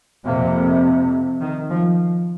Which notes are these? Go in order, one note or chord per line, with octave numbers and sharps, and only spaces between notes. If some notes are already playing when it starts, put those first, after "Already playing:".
F2 C3 A#3
D#3
F3